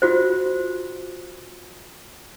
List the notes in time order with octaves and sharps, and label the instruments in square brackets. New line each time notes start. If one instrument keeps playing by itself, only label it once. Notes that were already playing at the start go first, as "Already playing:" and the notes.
[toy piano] F4 F#4 C5